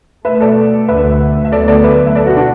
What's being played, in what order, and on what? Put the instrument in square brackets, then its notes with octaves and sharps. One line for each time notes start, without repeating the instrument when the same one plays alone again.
[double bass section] B2 A3 [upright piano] B4 E5
[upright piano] A4 D5
[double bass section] D2 D3 A3 [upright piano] B4 E5
[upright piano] E5
[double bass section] D2 D3 F#3 B3 [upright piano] A4 D5
[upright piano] A4 D5
B4 E5
E5
[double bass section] B2 B3 [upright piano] A4 D5
[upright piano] F#4 B4
D4 F#4